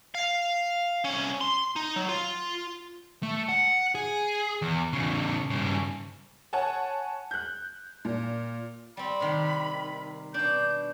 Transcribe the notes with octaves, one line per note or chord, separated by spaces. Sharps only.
F5
C2 C#4
C6
D#4
F#3
F4
A3
F#5
G#4
E2
E2 C#3
G2 C#3
C#5 F#5 G#5 A5
F#6 G6
A#2
G3 C4 B5
C3 D#3
B2 D4 G6